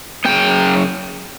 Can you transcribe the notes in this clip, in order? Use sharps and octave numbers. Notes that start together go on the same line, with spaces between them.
F#2 C#3 E3 B3 G5